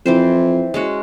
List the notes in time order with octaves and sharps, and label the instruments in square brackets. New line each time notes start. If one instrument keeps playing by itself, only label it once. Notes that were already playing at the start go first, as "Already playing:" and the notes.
[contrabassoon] F2 [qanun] E3 C4 C5
[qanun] G#3 C#4 F#4